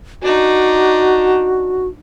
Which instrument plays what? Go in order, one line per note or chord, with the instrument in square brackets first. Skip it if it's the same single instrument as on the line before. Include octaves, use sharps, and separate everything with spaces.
[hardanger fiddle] D4 D#4 [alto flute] F#4